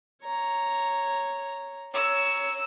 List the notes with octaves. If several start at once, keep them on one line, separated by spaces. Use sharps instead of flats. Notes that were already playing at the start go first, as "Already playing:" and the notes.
C#5 A#5
C#5 A#5 E6